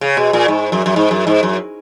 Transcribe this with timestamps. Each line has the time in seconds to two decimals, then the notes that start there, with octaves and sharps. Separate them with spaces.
0.01 C#3
0.17 B2
0.33 A#2
0.48 G#2
0.72 F#2
0.86 F#2
0.96 G#2
1.11 F#2
1.27 G#2
1.43 F#2